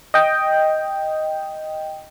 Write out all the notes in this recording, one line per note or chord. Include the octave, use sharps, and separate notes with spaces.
D#5 G5